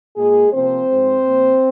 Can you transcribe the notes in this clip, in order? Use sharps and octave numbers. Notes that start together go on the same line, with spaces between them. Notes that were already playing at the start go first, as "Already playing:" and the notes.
A#2 G#3 A#3 G#4
C3 F3 A#3 C4 C5
G#2 F3 G#3
A#2 F3 A#3